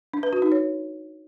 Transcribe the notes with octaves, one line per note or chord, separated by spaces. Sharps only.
D4
B4
F#4
D#4
C#5